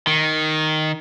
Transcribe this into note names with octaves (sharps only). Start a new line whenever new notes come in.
D#3